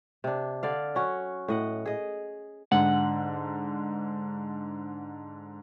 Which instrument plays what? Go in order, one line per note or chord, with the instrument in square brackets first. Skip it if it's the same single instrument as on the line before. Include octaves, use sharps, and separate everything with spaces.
[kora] C3 D4
D3 D5 F5
F#3 C#4 F#4
A2 D#5 F#5
G#4 D#5
[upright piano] G#2 D3 [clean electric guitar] F#5